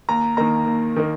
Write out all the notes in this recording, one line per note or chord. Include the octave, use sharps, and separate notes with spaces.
D#2 A#5
D#3 A#3 A#5
D#2
D#3 A#3